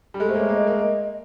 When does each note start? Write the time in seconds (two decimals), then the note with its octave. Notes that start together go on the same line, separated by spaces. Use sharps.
0.14 G3
0.20 G#3 A4
0.29 A3 C5
0.35 A#3
0.40 C#5
0.49 A#3 D#5
0.67 A#3